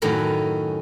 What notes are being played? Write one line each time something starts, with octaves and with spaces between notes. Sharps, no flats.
F#2 A2 D#3 C#4 F#4